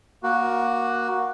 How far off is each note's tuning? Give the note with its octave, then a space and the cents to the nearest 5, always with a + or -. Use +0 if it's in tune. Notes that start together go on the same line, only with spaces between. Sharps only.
A#3 +15 F#4 +0